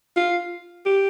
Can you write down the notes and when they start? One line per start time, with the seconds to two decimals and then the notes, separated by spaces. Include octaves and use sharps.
0.17 F4
0.86 G4